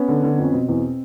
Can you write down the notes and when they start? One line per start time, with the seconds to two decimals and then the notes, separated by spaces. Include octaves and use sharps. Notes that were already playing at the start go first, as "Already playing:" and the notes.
Already playing: B3 C#4
0.08 D3
0.23 D3
0.38 F2
0.43 C#4
0.53 B2 C4
0.69 E2